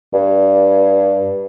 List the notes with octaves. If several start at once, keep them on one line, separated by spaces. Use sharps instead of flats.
G2